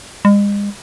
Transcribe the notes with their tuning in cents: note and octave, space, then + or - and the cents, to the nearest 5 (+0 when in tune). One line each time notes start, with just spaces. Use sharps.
G#3 -40